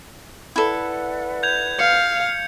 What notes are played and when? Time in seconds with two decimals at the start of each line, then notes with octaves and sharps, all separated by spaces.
0.56 E4 A4 B4 D5 F#5
1.43 G6 G#6 F7
1.79 F5 C#7